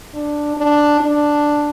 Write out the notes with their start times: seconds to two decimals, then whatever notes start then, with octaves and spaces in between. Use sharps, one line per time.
0.15 D4
0.57 D4
1.00 D4